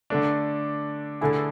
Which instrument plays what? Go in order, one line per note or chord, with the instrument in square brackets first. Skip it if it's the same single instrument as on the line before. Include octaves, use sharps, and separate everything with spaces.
[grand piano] D3 A3 D4
D3 A3 E4 G#4